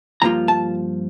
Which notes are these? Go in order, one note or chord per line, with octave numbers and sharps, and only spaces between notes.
G2 D3 F3 A#3 F4 A#5
A5